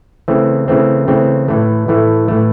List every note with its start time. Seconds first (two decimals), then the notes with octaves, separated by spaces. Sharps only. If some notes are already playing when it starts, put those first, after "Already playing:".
0.28 C#3 E3 A3 C4
0.68 C#3 E3 A3 C4
1.08 C#3 E3 A3 C4
1.48 A2 E3 A3
1.88 A2 E3 A3
2.28 A2 E3 A3